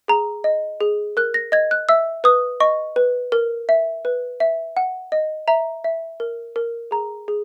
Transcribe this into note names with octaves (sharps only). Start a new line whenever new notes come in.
G#4 A#5
D#5
G#4
A#4 F#6
A#6
D#5 G#6
F#6
E5 E6
B4 D#6
D#5 C#6
B4
A#4
E5
B4
E5
F#5
D#5
E5 A#5
E5
A#4
A#4
G#4 A#5
G#4